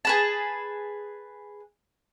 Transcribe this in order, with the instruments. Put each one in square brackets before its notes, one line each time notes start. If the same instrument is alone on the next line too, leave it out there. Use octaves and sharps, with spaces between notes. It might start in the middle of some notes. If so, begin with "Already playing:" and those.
[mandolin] G#4 B4 A5